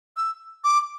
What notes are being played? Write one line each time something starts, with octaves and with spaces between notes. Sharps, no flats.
E6
D6